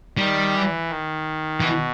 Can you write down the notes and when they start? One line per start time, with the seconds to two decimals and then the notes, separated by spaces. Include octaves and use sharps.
0.17 D#3 G3
0.54 E3
0.89 D#3
1.60 B2 E3